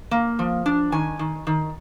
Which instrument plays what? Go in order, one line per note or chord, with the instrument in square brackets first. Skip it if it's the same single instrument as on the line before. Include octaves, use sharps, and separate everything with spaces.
[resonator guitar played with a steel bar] A#3
F3
D4
D#3 G#5
D#3
D#3